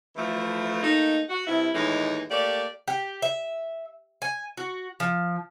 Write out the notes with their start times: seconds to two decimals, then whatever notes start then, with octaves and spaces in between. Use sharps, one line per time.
0.16 D2 E3 F3 A3
0.82 A3 A#3 D#4
1.29 F#4
1.47 G2 C3 E4
1.74 D#2 A2 E3 G#3 D#4
2.30 A3 A#3 G4 D5
2.88 G4
3.22 E5
4.22 G#5
4.57 F#4
5.00 F3